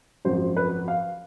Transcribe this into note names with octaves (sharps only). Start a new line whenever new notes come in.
G#1 F#2 C#3 F3 C5
B4
F5